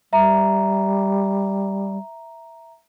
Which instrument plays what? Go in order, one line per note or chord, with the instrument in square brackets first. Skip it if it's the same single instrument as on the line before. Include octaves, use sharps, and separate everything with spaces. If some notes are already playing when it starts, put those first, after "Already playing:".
[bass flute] G3 [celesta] E5 A#5